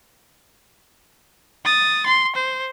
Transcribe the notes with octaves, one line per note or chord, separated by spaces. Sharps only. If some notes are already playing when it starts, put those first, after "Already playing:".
D#6 A6
C6
C5